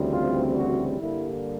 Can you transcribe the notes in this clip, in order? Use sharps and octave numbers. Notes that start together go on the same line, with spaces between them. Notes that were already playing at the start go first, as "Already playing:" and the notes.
Already playing: D2 C#3 E3 G3 C4
F4
F#4
G2 D3 G3 A#3 E4